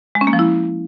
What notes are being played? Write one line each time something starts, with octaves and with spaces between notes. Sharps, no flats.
G#3
C#4
A#3
F3
E4